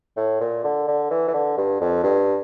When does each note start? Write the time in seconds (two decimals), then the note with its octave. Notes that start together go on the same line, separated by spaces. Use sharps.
0.17 A2
0.41 A#2
0.64 D3
0.88 D3
1.11 E3
1.29 E3
1.34 D3
1.58 G2
1.81 F2
2.04 G2